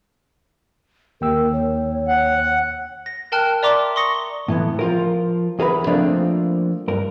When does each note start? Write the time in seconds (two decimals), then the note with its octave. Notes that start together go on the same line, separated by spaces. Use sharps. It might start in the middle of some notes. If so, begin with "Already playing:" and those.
1.21 D#2 A#4 G5 E6
1.53 C#5
2.08 F#5
3.06 A#6
3.32 A#4 G5 A5 F6 F#6
3.63 D5 E5 A#5 C6 D6
3.96 C6 C#6 D#6 A#6 C#7
4.14 G7
4.48 A2 E3 B3
4.79 F3 F4 A#4
5.59 E2 G#4 A#4 B4 B5
5.87 F3 A3 A#3 C4 D4 F4
6.88 G2 A#4